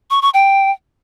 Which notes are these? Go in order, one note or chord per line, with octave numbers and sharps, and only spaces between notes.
C#6
C#6
G5